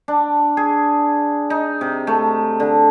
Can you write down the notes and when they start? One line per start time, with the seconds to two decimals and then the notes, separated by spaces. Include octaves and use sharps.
0.08 D4
0.57 G#4
1.50 D#4
1.81 C3
2.07 A3
2.60 D3